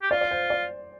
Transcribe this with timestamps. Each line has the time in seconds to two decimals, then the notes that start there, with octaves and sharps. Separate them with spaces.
0.02 G4
0.11 F4 D5
0.21 D5
0.31 C5
0.50 D5